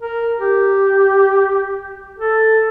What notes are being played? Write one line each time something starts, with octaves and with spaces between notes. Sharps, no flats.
A#4
G4
A4